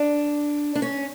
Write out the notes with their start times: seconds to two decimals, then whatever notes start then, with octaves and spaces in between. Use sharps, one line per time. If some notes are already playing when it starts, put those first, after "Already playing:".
Already playing: D4
0.75 D4
0.82 C#4